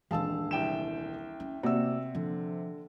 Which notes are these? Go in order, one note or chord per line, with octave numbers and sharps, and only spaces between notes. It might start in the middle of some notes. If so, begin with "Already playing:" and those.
D#1 E3 G#3 D4 F5 A5 E6
C2 G5 E7
C#4
C3 A#3 F#4 D5 E6
D3 F3